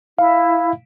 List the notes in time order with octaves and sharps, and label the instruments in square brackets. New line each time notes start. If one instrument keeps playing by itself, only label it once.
[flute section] E4 [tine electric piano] F5